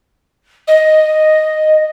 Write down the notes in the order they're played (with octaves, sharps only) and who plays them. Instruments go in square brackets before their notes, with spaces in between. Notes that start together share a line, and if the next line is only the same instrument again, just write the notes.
[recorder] D#5